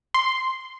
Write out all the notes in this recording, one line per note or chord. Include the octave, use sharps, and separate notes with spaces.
C6